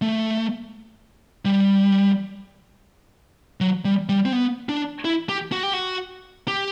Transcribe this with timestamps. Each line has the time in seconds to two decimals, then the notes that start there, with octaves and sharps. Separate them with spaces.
0.02 A3
1.45 G3
3.61 F#3
3.85 G3
4.09 G3
4.25 C4
4.33 B3
4.69 D4
5.05 E4
5.29 G4
5.52 F#4
5.63 G4
5.73 F#4
6.48 G4